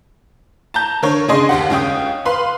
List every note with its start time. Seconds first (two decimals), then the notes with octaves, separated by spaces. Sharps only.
0.74 A5 A#5 G6
1.02 D3 A#4 C#5
1.28 C#3 D4 G#4 D#5 C6
1.49 D#2 G4 F#5
1.70 C#2 C#4 G5 D#6
2.25 B4 F5 B5 C6